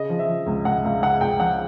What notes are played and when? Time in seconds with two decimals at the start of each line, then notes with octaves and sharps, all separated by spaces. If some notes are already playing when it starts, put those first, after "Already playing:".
Already playing: C#3 D#5
0.10 F3
0.19 E5
0.28 F3
0.46 C#2
0.65 C#2 F#5
0.84 C#2 F5
1.02 C#3 F#5
1.21 C#2 G5
1.40 F3 F#5